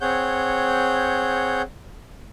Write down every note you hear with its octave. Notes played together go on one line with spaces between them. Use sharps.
C4 G#4 C#5 F#5 G6